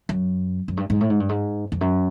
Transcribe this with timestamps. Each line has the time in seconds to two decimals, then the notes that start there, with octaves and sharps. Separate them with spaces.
0.09 F#2
0.68 F#2
0.77 G2
0.90 G#2
1.01 A2
1.10 G#2
1.20 G2
1.29 G#2
1.72 F2
1.81 F#2